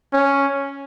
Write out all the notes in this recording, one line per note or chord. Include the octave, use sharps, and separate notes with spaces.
C#4